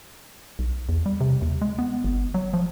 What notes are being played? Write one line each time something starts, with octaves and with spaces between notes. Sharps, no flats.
B1
E2
G3
C3
D#2
G#3
B3
G1
F#3
F3